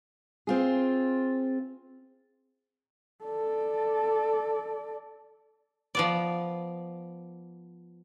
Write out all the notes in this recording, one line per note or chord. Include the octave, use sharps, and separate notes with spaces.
C4 F4 G#4
A4 D5
F3 B3 D5